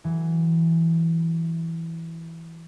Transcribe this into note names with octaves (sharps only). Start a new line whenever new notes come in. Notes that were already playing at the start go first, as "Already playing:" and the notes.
E3 F#3